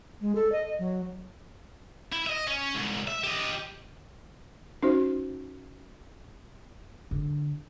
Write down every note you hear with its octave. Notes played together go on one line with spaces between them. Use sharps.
G#3
A4
D#5
F#3
E4
D#5 E5
C#4
C2 G#2
E5
G4 D#5
C#4 D#4 F#4 C5
D3